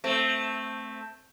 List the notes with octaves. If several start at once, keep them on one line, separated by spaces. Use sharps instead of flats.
A3 C4